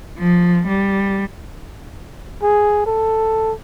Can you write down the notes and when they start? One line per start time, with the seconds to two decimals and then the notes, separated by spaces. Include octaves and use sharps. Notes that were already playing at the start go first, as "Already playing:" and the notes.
0.19 F3
0.68 G3
2.42 G#4
2.86 A4